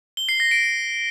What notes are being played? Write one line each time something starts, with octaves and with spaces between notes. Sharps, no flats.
G7
C7
A#6
D7